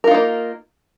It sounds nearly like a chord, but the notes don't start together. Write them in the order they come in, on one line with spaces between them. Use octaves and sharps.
A#4 F4 D#4 A#3